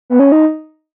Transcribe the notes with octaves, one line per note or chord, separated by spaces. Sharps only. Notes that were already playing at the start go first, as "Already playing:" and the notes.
B3
C#4
D#4